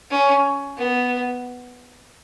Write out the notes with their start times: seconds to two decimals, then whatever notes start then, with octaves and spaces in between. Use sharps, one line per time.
0.10 C#4
0.78 B3